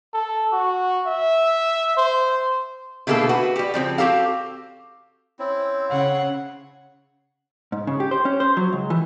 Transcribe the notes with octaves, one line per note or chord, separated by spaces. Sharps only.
A4
F#4
E5
C5
B2 D3 A3 A#3 G#4 A4
F#4 B4
G3 G4
C#3 F3 C4
C4 F#4 G4 A4 F5
C4 C#4 E4
C#3 C#5 F#5
G#2
C#3
G4
C5
C#4
C5
F#3
C#2
E3